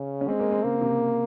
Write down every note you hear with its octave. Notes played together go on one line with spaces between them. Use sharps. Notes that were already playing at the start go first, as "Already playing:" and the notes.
Already playing: C#3 C#4
C#4
G#3 C4
A#3
C4
C#3 A#3
C3